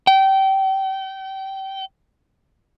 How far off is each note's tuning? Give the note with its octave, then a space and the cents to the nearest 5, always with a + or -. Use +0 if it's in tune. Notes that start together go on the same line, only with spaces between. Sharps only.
G5 -25